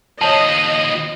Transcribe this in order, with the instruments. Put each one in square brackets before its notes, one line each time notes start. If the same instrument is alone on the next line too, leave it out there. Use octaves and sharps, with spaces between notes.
[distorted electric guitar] D#2 F3 [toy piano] C#5 A5 [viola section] D#5